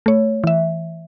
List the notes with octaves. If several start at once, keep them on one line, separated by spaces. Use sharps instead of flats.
A3 C#5
E3 E5